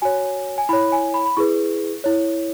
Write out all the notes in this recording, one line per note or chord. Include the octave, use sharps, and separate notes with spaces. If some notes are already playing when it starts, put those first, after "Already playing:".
F#4 C#5 G#5
G#5
E4 C#5 B5
G#5
B5
B5
E4 G#4 B4 C#6
E4 C#5